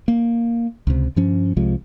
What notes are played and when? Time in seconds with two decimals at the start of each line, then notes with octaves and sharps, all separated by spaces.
0.08 A#3
0.87 C#2 C3
1.16 G2 F3 C#4
1.56 C2 C3 F3 G#3